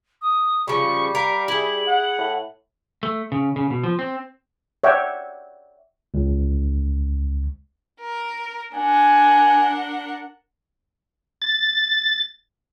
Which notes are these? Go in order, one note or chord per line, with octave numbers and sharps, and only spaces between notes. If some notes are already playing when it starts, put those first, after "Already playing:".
D#6
C#3 F3 G3 C#6
A#4 F5 B6
E4 G#4 F#7
F#5
A2
A3
C#3
C#3
B2
F3
C4
C#5 D5 E5 F#5 G5
C#2
A#4
D4 A#4 F#5 G#5
A6